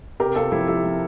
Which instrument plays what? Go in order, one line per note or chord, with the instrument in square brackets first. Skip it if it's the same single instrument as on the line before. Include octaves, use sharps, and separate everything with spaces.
[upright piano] C3 G4 A#4
C3 F4 A4
F3 E4 G4
F3 E4 G4
F3